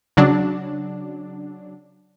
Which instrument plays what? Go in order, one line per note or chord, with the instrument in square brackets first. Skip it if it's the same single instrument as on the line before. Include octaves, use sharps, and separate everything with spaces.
[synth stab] C#3 F#3 D4